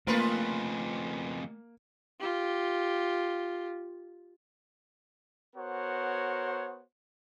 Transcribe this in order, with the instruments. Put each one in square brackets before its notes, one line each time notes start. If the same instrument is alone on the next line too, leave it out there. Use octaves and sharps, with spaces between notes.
[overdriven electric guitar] F2 C#3 [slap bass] A3 [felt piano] A#3 [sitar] F4 A#4 B4
[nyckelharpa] F4 G4
[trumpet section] B3 F#4 A#4 C5 C#5 F#5